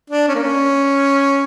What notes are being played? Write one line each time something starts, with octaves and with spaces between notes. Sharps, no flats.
D4
C#4
A#3
C#4